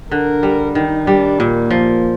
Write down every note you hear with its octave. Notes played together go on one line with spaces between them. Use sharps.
D3 A#4
G3
D#3 D#4
G3 D4
A#2 A#3
F3